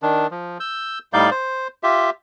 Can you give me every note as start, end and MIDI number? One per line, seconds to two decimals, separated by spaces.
0.02 0.27 51
0.02 0.27 62
0.31 0.58 53
0.60 0.99 88
0.60 0.99 91
1.13 1.30 45
1.13 1.30 55
1.13 1.30 63
1.13 1.30 74
1.13 1.30 77
1.13 1.30 91
1.31 1.68 72
1.83 2.10 65
1.83 2.10 67
1.83 2.10 76